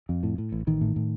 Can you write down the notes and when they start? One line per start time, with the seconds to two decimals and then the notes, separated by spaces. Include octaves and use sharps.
0.09 F2
0.23 A2
0.38 A2
0.52 A1
0.67 A1 D#3
0.81 A2
0.96 A2